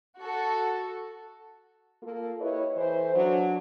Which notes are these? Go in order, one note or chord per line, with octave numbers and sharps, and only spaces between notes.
F#4 A4
A#3 F4 A4
E4 G4 B4 C#5 D#5
E3 A4 C5
F#3 D4